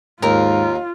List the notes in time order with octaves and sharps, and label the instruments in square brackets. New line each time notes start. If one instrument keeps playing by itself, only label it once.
[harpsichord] D#2 [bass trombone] G#2 [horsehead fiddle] F4 [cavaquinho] A#4